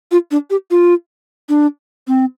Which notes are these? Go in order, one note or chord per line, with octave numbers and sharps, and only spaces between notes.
F4
D4
G4
F4
D4
C4